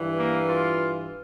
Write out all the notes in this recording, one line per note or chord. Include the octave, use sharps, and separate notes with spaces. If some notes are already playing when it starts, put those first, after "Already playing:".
Already playing: G2 E3
A#3
F4